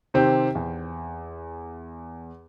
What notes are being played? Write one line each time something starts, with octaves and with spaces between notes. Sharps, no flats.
C3 D#3 C4 G4
E2